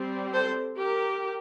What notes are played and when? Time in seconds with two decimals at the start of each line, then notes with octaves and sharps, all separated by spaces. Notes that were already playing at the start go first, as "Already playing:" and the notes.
Already playing: G3 C4
0.33 A4 C5
0.77 G4 A#4